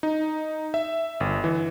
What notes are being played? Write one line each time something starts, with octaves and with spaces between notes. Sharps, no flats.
D#4
E5
G1
E3